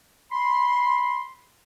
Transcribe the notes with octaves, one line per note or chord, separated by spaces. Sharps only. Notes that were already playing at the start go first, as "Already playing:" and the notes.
B5 C6